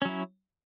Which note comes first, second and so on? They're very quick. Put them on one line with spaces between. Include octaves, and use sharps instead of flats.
C#4 F#3 E4